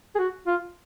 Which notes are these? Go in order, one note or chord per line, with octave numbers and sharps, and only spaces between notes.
G#4
F#4
F4